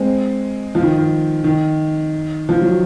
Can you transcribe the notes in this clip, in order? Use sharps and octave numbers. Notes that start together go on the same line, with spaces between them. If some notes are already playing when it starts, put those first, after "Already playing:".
Already playing: G#3 C4
F3
D#3
D#3
D#3
F3
F#3